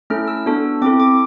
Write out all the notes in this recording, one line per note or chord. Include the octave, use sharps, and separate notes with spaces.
A3 C#4 E4 A4 F6
E6
B3 D4 F#4 A4
C4 E4 A4 D6
D6